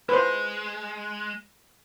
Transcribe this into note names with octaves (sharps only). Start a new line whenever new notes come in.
G#3 B4 C5